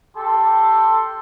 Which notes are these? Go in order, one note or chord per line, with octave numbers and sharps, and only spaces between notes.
G4 A4 C6